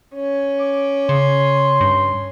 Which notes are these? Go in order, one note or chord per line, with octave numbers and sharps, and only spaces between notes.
C#4
D6
C#3 C6
G2